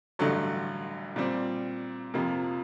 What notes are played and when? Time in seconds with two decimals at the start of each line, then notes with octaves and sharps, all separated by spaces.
0.19 A1 G2 D3 F#3 A3
1.16 A#2 G3 C4
2.14 F2 C3 F3 A#3